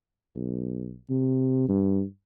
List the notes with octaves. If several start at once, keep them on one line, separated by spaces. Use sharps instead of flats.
B1
C3
G2